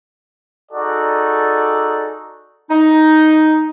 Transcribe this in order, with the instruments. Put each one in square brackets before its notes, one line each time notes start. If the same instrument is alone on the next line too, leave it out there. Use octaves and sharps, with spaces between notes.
[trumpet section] D#4 F#4 G#4 A4 D5
[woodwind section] D#4